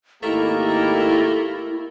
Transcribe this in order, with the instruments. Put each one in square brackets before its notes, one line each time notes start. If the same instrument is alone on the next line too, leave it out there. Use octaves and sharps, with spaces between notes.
[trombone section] G#1 D#4 G4 [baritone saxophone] A3 [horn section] A#3 A#4 [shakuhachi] E4